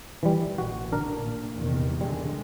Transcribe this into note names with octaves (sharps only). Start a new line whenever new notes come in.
E3 G3
A1 A#2 F#4
D3 D4 A#4
A#2
E2 C3 D#3
D3 G3 G#3